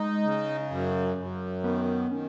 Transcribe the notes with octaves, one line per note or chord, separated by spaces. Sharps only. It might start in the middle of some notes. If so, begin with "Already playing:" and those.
Already playing: G#3 D#4
C#3
F#2
F#2
D#3 B3
D#3 C#4